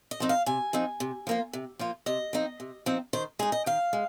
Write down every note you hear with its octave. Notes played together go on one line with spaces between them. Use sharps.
D#5
F3 C4 D#4
F5
C3 G#5
F3 C4 D#4
C3
F3 A#3 F4
C3
F3 A#3 F4
C3 D#5
F3 C4 D#4
C3
F3 C4 D#4
D#3 C5
G#3 D#4 G#4
D#5
D#3 F5
G#3